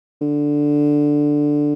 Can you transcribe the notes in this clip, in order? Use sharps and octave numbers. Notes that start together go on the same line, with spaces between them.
D3